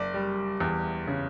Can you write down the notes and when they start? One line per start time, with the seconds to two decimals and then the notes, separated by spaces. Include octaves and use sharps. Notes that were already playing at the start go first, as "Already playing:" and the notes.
Already playing: F#1 D5
0.14 G3
0.60 E2
1.07 C#3